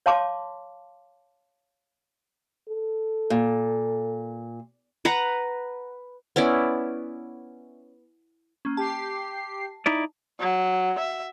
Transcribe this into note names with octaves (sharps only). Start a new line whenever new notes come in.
C#5 F5 A5 C6 D6
A4
A#2
B4 F#5 A#5
B3 C#4 E4 D5
A#3 C#4
G4 A5 C7
D#4 E4 D5
F#3
E5